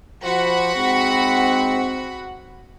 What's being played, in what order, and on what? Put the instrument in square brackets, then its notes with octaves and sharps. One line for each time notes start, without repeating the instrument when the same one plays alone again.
[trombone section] F3 C5 [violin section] F#4 F#5 B5
[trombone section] G#2 C4